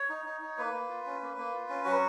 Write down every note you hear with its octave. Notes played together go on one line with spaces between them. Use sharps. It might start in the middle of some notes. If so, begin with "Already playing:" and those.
Already playing: C#5
D#4
D#4
D#4
A#3 B4
A#3
F4
C#4
A#3
A#3
F4
C#4
F#3 F#4